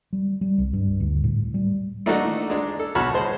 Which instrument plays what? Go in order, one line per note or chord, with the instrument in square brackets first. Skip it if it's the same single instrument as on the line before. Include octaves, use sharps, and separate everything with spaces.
[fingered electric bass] G3
G3
C2
G2
D2
A2
G3
[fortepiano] A3 A#3 D4 D#4 F#4 A4
G#3 D4
A4
B1 F#4 C#5 A5 B5 F6
G#3 C5